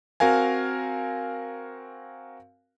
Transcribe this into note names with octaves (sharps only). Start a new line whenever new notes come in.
C4 F#4 A#4 F5 G#5